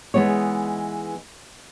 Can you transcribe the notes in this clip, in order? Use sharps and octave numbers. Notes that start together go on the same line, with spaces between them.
E3 G#3 B3 D#4 C#5